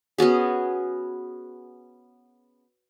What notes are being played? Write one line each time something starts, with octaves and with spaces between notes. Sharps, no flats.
B3 C#4 F#4 G#4